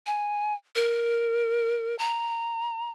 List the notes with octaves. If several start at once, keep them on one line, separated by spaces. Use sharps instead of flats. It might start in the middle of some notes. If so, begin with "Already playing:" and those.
G#5
A#4
A#5